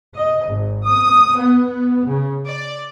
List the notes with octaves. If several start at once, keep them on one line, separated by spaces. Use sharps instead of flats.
D#5
G#1
D#6
B3
C#3
D5